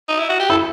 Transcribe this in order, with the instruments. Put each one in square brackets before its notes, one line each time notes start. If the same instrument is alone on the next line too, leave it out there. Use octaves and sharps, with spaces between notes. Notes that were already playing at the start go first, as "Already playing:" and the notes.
[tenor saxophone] D#4
E4
F#4
G4
[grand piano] E4 [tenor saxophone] A4